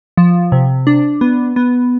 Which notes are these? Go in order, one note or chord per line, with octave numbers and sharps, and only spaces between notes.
F3
C3
D4
B3
B3